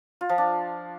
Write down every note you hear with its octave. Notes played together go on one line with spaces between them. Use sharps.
F4
F3
D4